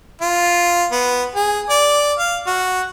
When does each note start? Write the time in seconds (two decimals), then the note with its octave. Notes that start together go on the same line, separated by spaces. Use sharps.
0.22 F4
0.92 B3
1.35 G#4
1.70 D5
2.19 F5
2.47 F#4